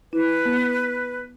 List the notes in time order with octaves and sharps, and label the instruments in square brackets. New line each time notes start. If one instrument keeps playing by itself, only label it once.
[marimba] E4 [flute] B4
[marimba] B3